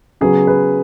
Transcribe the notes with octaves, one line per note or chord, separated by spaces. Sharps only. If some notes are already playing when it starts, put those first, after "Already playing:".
C#3 F#3 B3 G#4
B4